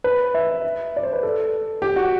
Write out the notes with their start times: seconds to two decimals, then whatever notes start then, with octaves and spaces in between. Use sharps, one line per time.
0.04 B4
0.34 E5
0.96 D5
1.03 C5
1.13 B4
1.23 A4
1.82 G4
1.96 F#4